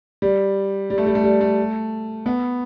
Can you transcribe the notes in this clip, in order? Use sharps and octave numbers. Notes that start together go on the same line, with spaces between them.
G3
G3
A3
G3
A3
G3
A3
B3